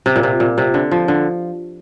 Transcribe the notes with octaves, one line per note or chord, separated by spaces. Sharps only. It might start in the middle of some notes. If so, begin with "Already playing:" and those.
C3
A#2
C3
A#2
C3
D3
F3
D3